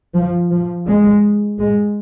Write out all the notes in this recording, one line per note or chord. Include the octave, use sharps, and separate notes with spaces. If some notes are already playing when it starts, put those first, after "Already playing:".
F3
F3
G#3
G#3